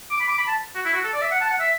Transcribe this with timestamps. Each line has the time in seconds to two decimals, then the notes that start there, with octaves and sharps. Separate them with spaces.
0.10 D6
0.20 B5
0.29 D6
0.38 B5
0.48 A5
0.75 F#4
0.85 E4
0.94 F#4
1.04 A4
1.13 D5
1.22 E5
1.31 F#5
1.41 A5
1.50 F#5
1.60 E5